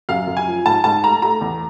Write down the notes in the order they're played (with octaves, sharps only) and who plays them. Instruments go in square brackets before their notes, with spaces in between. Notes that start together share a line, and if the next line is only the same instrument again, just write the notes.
[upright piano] F#2 F5
F#2
G#5
F3
G#2 A5
G#2 A5
A3 A#5
A3 A#5
E2